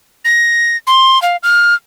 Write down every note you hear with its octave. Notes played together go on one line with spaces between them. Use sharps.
A#6
C6
F5
F6